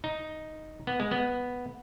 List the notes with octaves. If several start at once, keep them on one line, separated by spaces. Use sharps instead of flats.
D#4
B3
G#3
B3